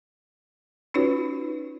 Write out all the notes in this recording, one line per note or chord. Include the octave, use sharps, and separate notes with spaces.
C#4 D#4 F4 F#4 B4 C#5